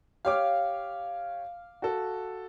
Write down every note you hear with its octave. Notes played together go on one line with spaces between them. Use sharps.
G4 C#5 F5 D6
F#4 A4